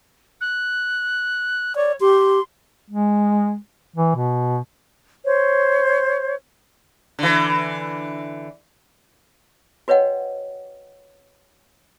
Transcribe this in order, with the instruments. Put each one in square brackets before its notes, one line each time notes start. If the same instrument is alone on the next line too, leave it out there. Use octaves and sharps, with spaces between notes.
[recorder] F#6
[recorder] C#5 [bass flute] D5
[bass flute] G4 [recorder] C6
[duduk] G#3
E3
B2
[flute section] C5 C#5
[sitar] D3 E3
[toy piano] F#4 B4 C#5 D#5 F#5 G5